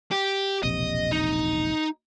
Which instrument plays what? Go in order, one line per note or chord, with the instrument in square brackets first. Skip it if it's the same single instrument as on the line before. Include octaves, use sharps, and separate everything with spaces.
[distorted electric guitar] G4
[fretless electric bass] E1 A#1 C3 [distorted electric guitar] D#5
[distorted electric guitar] D#4